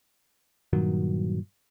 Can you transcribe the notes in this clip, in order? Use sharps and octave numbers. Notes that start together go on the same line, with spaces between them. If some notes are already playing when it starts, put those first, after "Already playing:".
G2 A#2 D#3 F#3